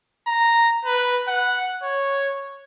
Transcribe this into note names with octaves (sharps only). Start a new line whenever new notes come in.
A#5
B4
F#5
C#5